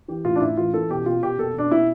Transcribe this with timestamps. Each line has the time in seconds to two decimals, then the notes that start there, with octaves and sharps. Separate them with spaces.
0.08 E3 G4
0.25 A2 F4
0.36 D4
0.41 A2 E4
0.57 E3 F4
0.73 E3 A4
0.89 B2 G4
1.06 B2 F4
1.22 B2 G4
1.38 B2 A4
1.54 B2 D4
1.71 B2 E4